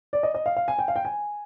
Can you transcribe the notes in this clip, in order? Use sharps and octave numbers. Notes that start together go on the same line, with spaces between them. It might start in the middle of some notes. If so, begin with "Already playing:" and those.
D5
D#5
D#5
F5
F5
G#5
G5
F5
G5
G#5